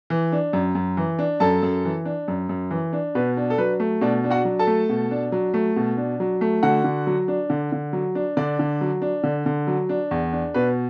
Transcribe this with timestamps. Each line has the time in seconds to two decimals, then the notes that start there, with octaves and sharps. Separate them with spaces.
0.10 E3
0.32 D4
0.53 F#2
0.75 F#2
0.97 E3
1.19 D4
1.40 F#2 A4 A5
1.63 F#2
1.85 E3
2.05 D4
2.28 F#2
2.49 F#2
2.71 E3
2.93 D4
3.15 B2 B4
3.37 D4
3.50 A4
3.58 F#3 B4
3.80 A3
4.01 B2 D4 D5
4.24 D4
4.30 F#4 F#5
4.45 F#3
4.59 A4 A5
4.67 A3
4.89 B2
5.11 D4
5.32 F#3
5.54 A3
5.76 B2
5.97 D4
6.20 F#3
6.41 A3
6.63 D3 F#4 F#5
6.84 D3
7.07 F#3
7.28 D4
7.50 D3
7.72 D3
7.93 F#3
8.15 D4
8.37 D3 D4 D5
8.59 D3
8.81 F#3
9.02 D4
9.23 D3
9.46 D3
9.67 F#3
9.89 D4
10.11 E2
10.33 D4
10.54 B2 B4